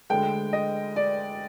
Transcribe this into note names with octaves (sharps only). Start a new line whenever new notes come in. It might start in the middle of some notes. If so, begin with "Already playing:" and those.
D2 D3 G#3 G5
D#5
D5